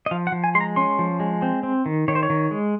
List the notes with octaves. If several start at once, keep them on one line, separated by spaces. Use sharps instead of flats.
D#5
F3 F5
F#5
F3
G#5
G#3 C6
A#5
C#4 C6
F3
G#3
C4
C4
D#3
D#3 C#5
C5
C#5
D#3
G#3